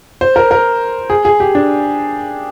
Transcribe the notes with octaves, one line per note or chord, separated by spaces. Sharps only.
C5
A#4
A#4
G#4
G#4
G4
D4